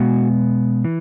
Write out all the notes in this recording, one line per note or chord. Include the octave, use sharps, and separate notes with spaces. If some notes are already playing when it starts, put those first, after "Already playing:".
Already playing: B2 G#3 B3 F#4
E3